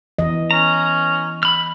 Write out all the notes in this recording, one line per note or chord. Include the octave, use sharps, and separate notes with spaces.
E3 D#5
C#4 A#5
B5 F6